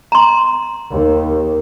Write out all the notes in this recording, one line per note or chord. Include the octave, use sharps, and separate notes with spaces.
A#5 C6
D#2